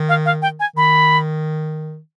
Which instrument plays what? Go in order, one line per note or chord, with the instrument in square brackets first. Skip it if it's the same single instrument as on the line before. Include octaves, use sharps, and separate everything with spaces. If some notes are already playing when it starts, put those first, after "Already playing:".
Already playing: [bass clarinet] D#3
[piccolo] F5
F5
G5
G#5
[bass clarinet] D#3 [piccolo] B5